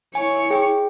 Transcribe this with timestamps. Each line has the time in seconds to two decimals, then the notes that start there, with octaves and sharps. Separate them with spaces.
0.15 E4 C#5 G#5
0.50 G#4 G5